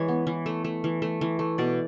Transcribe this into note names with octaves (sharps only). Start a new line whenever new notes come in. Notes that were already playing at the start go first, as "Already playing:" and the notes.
Already playing: E3 G#3 C#5
B3
E3
A3
A3
E3
A3
E3
A3
B2 D5